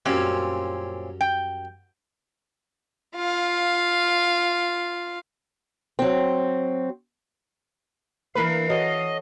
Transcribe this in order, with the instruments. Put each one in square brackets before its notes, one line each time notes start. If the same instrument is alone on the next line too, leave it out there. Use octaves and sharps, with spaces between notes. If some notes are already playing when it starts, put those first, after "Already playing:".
[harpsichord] F#2 F#3 G3 [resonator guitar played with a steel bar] A#2 C4 C#4
[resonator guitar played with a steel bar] G5
[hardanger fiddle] F4 F5
[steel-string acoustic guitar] F#3 C4
[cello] E3 F5 [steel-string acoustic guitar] A#3 D4 E4 [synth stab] A#4 B4
[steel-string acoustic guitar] F#4 A4 C#5 [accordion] D#5